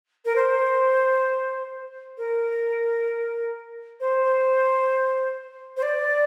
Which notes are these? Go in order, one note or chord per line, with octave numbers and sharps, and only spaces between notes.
A#4
C5
A#4
C5
C5
D5